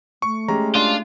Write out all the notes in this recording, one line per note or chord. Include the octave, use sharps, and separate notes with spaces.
A3 C#6
G#3 C#4 G4 A#5
D4 F4 D#7